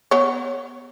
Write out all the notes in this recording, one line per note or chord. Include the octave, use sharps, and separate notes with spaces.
B3 C#5